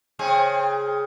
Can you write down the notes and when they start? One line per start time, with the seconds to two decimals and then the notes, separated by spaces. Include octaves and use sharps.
0.19 C#3 C4 G#4